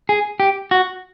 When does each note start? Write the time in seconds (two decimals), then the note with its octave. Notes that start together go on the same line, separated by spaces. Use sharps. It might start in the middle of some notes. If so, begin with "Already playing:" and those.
0.09 G#4
0.40 G4
0.71 F#4